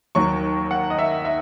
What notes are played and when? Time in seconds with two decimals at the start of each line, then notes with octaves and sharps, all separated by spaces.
0.15 D#2 D#3 F#3 C#6
0.71 F#5
0.90 D#5
0.98 E5
1.25 E5